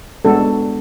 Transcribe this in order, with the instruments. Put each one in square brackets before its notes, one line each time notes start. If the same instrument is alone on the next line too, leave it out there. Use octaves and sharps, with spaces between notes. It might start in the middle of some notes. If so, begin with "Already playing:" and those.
[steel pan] G#3 B3 D4 F#4 A4